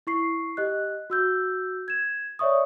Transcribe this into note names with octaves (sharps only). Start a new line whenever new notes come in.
E4 C#6 C7
G4 D#5 F#6
F#4 E6 G6
G#6 E7
C#5 D5 E5 C#6 D#6